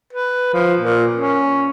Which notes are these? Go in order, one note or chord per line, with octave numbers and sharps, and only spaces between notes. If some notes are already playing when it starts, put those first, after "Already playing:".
B4
F3
A#2
C#4